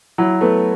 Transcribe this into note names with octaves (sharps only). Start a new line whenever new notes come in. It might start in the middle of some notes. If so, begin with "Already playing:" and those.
F#3 E4
A3 B3